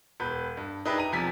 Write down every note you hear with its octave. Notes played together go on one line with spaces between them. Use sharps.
E1 B4 G6
G2
D4 D#4 G4 G#4 B4 E5
A#5 D#7
E1 C3 F3 G#5 B6